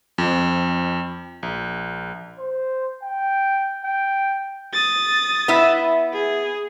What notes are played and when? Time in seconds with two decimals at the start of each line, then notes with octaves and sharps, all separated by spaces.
0.18 F2
1.43 A#1
2.39 C5
3.03 G5
3.84 G5
4.73 D#6 A6
5.48 B3 E4 E5
6.13 G#4